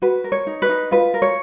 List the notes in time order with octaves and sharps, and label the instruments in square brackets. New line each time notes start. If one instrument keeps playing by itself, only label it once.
[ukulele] F#4 B4
A#4
C#5
D#4
B4
D#4
F4 B4
A#4
C#5